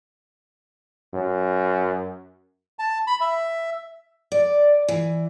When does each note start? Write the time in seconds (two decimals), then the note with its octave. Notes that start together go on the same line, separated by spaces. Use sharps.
1.14 F#2
2.79 A5
3.07 B5
3.21 E5
4.32 D5
4.88 E3